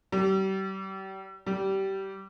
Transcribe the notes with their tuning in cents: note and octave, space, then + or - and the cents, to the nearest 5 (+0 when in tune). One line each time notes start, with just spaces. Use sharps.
G3 -35
G3 -20